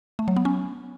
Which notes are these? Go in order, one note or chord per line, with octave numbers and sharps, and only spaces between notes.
A3
F#3
B3
C#4